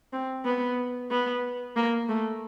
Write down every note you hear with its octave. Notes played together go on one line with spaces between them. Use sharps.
C4
B3
B3
A#3
A3